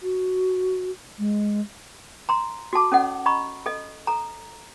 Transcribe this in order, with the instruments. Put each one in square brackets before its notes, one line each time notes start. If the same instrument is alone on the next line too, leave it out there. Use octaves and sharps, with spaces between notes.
[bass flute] F#4
G#3
[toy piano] A#5 C6
F#4 A4 A5 D6
C#4 A4 C#5 D#5 F#5
D#5 A#5 B5 C#6
A4 D#5
A4 A#5